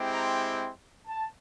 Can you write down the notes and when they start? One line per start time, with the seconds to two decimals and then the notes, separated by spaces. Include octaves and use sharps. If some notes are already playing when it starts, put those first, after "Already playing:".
Already playing: G#3 C4 E4 G4
0.12 A#5
1.07 A5